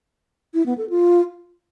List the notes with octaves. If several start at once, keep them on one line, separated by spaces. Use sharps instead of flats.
E4
B3
A4
F4